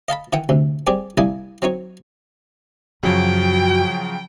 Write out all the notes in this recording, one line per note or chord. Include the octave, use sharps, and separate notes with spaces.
D#5 F5 A5 B5
D#3 E3 F#5 G5
D2 C3
G3 C4 G4 G#4 D5
C2 G3 A#3 E4 G#5 D#6
F#3 C4 D#4 C#5
F#2 C#3 F3 F#3 F#4 G5